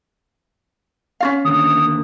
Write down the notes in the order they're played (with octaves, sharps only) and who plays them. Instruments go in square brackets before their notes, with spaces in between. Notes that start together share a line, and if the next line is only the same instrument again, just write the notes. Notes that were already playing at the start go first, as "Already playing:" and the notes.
[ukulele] C#4 F4 F5
[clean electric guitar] D#2 D3 [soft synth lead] D#6